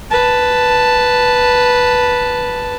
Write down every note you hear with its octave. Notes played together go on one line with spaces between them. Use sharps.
B4 A5